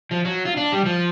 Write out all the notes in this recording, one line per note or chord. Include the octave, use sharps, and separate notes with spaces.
F3
F#3
F4
D4
G3
F3